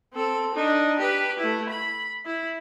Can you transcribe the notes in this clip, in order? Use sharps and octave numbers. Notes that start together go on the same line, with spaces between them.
C4 A4
D4 D#4
G4 B4
A3 E4
B5
E4